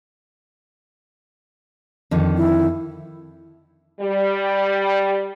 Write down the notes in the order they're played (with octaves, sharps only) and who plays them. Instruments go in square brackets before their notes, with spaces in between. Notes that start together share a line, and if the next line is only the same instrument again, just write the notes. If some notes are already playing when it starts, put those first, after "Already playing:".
[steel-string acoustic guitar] F2 D3 D#3
[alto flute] E4
[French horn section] G3